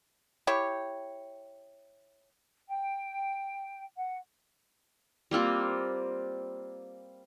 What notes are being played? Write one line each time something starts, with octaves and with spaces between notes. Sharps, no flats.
E4 G4 C#5
G5
F#5
G3 A#3 C4 F4